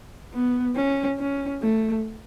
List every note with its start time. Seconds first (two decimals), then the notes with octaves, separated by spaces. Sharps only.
0.33 B3
0.76 C#4
1.19 C#4
1.62 A3